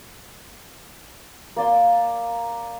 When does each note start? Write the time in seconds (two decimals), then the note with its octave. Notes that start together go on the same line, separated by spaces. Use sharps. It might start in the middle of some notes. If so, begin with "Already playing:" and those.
1.56 A#3 D5 C6